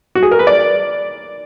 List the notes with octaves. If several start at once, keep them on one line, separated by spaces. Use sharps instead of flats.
F#4
G#4
A#4
B4
D5